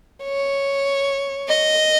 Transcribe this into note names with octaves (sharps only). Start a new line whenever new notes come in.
C#5
D#5